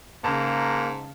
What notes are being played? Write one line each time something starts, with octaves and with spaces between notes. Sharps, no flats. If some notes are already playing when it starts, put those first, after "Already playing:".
G#2 C#3 A#3 A5